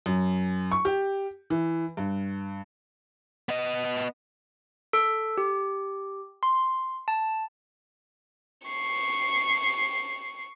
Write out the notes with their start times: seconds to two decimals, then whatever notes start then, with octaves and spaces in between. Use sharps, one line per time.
0.06 F#2
0.72 C#6
0.85 G4
1.50 E3
1.97 G2
3.49 B3 D#5
4.93 A4
5.38 G4
6.43 C6
7.08 A5
8.66 C#6 C7